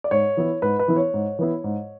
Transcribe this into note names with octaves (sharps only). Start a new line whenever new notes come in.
D5
G#2 C#5
E3 B3 E4
G#2 B4
B4
E3 B3 E4
C#5
G#2
E3 B3 E4
G#2